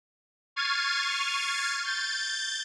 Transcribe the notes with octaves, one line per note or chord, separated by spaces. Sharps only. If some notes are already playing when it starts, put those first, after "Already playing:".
C#6 F6 G#6 A6 C7 D#7
G6 A6